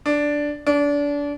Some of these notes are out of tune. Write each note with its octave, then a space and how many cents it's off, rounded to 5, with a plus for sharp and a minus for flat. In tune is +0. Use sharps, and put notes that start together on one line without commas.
D4 -5
D4 -30